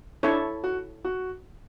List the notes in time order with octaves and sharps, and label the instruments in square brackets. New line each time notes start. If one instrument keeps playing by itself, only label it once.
[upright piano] D4 [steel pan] E4 A4 C#5
[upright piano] F#4
F#4